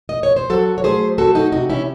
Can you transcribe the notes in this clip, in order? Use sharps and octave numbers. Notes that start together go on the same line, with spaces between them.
D#5
C#5
C5
F#3 F#4 A4
C#5
A3 G#4 C5
C4 F#4 A4
D#4 F#4
C3 D#4 F#4
C#4 E4